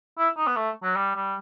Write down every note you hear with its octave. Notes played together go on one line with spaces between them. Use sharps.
E4
D#4
B3
A3
F#3
G3
G3